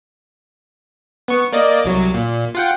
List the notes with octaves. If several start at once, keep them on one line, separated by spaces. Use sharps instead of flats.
B3 C#6
A#3 D5 D#5
C2 F#3
A#2
F4 F#5 G5